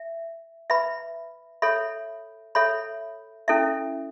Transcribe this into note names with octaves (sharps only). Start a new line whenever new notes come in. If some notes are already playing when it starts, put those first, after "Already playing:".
Already playing: E5
B4 E5 B5
A4 C#5 E5 B5
A4 C#5 E5 B5
C#4 E4 A4 E5